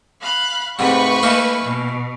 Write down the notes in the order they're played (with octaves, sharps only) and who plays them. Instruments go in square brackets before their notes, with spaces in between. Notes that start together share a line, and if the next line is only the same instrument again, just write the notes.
[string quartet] F5 B5 F#6
[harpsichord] G#2 C3 [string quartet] A3 F5 [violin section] B4 C#6
[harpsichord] E3 A#3 D#4
[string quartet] B2